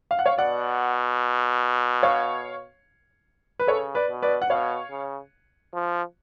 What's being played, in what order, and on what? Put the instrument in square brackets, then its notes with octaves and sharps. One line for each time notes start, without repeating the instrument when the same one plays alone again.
[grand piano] F5
F#5
C#5 F5
[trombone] B2 [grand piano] D5 F#5
[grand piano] C#5 F5
B4
[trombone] C#3 [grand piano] A4 C#5
[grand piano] B4 D5
[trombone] B2
[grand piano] B4 D5
F#5
[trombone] B2 [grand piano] C#5 F5
[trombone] C#3
F3